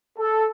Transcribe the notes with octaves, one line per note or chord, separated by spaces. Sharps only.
A4